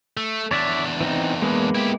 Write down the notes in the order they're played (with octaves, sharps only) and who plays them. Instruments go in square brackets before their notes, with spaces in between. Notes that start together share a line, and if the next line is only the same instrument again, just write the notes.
[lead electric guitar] A3
[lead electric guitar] E2 D4 [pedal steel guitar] C#5 D5 E5
[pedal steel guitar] E3 C4 D#4
G#3 A#3 B3
[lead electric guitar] E4 G4